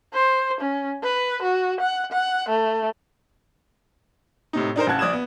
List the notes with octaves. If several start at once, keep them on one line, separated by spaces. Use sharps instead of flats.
C5
C#4
B4
F#4
F#5
F#5
A3
A2 C3 D#4
D4 D#4 A#4 C5
A1 C#3 F#5 A5 F#6 G#6
A#1 D5 D#6 G#6 E7
B3